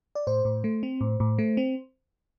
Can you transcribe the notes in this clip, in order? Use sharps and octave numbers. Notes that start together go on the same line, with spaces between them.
D5
A2 C5
A2
A3
C4
A2
A2
A3
C4